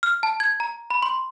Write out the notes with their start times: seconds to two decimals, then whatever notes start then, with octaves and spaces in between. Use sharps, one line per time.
0.03 F6
0.23 A5
0.40 G#6
0.60 A#5
0.90 B5
1.02 C6